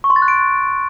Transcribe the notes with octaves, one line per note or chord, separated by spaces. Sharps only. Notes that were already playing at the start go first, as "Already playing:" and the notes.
C#6
C6
A6
F#6
D7